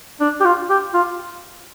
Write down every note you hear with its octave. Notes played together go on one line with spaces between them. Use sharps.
D4
G4
F4
G4
F4